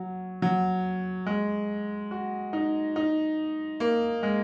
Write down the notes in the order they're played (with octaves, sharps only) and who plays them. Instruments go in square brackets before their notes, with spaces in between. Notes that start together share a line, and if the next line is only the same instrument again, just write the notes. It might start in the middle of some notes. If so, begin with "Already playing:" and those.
Already playing: [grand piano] F#3
F#3
G#3
F#4
D#4
D#4
A#3
G#3